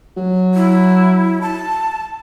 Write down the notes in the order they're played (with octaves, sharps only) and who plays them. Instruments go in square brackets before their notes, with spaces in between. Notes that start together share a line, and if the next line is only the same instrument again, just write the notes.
[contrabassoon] F#3
[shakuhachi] E4
A5